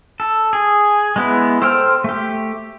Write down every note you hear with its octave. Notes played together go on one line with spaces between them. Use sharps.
A4
G#4
G#3 B3 E4
A4 C5 G5 C6 F6
A3 G4